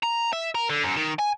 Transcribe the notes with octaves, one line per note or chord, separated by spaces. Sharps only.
A#5
E5
A#4
D3
F#2
D#3
G#5